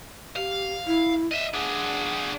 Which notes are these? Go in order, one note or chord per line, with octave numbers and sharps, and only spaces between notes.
G4 F5
E4
D#5 E5
D4 G#4 F#5